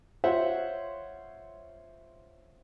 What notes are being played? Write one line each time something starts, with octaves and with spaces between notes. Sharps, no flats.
F4 C5 C#5 E5 F#5